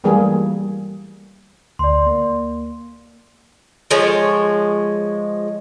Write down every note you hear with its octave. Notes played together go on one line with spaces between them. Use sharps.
E3 G3 A3 A#3 G#4
D2 D5 C6
A#3
F3 G#3 C#5